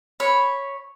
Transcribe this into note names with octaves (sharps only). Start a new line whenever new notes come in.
C#5 B5